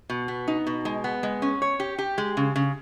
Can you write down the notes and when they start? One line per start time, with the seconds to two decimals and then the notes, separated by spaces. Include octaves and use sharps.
0.10 B2
0.28 B3
0.48 D#4
0.67 B2
0.85 G#3
1.04 B3
1.23 G#3
1.42 C#4
1.62 C#5
1.80 G4
1.98 G4
2.18 G#3
2.37 C#3
2.56 C#3